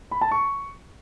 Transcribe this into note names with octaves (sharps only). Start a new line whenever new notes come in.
B5
A5
C#6